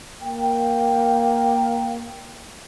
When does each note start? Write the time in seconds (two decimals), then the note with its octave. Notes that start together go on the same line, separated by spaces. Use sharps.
0.21 A#3 G5